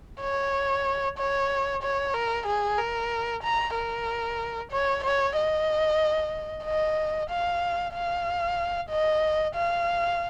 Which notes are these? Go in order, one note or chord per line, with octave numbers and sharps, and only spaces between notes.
C#5
C#5
C#5
A#4
G#4
A#4
A#5
A#4
C#5
C#5
D#5
D#5
F5
F5
D#5
F5